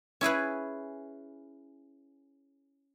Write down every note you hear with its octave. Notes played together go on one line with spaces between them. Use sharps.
C#4 E4 G#4 B4